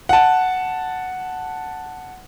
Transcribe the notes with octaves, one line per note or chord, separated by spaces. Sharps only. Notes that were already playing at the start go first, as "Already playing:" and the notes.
F#5 A5